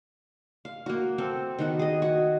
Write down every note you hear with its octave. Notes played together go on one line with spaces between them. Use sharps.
F5
A#3 F#4
C4 A4
D#3 B3 F#4
G#4 D#5
F#4